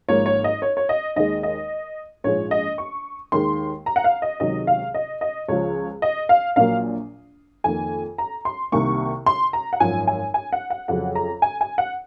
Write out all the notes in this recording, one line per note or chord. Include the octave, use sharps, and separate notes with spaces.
G#1 G#2 F3 A#3 C#5
C#5
D#5
C#5
C#5
D#5
D#2 D#3 G#3 D#5
D#5
A#1 G#2 F3 G#3 C#5
D#5
C#6
D#2 D#3 G#3 C6
A#5
F#5
F5
D#5
C#2 C3 D#3 F#3 D#5
F5
D#5
D#5
C#2 C#3 F3 C#5
D#5
F5
A#1 A#2 F#3 A#3 F5
F2 D#3 A#3 G#5
A#5
C6
C2 C3 D#3 A#3 C#6
C6
A#5
F#5
G#1 F#2 F3 G#5
G#5
G#5
F#5
F#5
F2 C#3 F#3 F#5
A#5
G#5
G#5
F#5